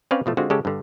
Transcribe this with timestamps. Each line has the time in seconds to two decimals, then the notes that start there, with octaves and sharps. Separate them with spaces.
0.11 C4 C#4 B4 C#5 D5 F5
0.26 B2 F3 A3
0.37 D3 G#3 C4 F4 F#4
0.50 C#3 G#3 C#4 G4 A4
0.65 G2 D3